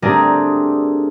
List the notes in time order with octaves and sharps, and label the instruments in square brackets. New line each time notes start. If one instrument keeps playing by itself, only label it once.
[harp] A3 C4 D4 G4 G#4 A#4